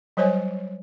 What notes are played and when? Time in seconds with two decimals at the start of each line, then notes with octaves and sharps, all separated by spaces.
0.17 F#3 G3 C5 C#5 D#5 G#5